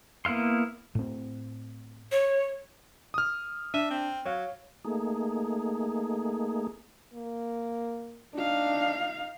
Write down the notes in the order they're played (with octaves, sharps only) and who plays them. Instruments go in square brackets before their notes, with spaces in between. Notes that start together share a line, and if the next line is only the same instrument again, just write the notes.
[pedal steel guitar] A#3 B3 E4 F5 C6
[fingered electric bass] A2 C4
[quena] C#5
[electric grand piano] D#6 F6
[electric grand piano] D4 D#7 [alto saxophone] E5
[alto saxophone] C4
[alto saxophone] F#3 [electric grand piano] C#5 F5
[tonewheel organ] A3 A#3 D#4 G#4
[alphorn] A#3
[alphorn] D4 [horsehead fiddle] D#4 F5